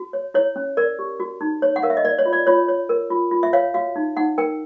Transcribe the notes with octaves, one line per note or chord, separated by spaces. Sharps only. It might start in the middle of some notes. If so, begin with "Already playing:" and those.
Already playing: F#4
C#5
E4 C#5
C#4
A#4 D5
G4
F#4
D#4
C#5
F#5
A#4 F5
E5
D#5
A#4 D5
C#5
F4
D5
F4 C#5
C#5
A#4
F4
F4
E5
C#5 F5
F#4 F5
D#4
D#4 F#5
A#4 G5